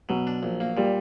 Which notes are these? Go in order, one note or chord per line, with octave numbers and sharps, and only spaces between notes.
B2 F#3
D4
A#1
A#3
A#2 G3